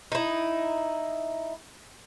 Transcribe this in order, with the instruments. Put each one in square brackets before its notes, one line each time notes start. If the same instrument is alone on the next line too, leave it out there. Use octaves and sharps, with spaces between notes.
[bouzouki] D#4 E4